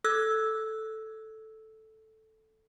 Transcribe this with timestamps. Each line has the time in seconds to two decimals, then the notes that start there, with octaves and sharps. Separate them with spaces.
0.04 A4 E6 F#6 G#6